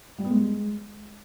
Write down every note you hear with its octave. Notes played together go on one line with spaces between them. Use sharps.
G3
B3
G#3